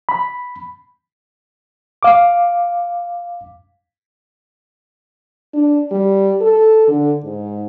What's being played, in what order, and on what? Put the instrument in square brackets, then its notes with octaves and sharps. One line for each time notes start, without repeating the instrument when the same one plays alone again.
[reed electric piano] B5
F5 D6
[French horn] D4
G3
A4
D3
G#2